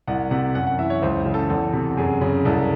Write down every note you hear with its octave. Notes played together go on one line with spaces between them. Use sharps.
C2 F#5
C3 F#5
F#2 F#5
F#5
E3 E5
C#5
C#2 C5
C#3
A4
E2 A4
C3
F#2 G#4
C#3
C2 A4